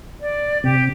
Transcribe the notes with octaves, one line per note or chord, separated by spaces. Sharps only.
D5
C3 G4